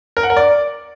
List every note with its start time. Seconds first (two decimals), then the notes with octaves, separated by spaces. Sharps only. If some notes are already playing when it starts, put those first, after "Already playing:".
0.17 A#4
0.23 F#5
0.30 A#4
0.37 D5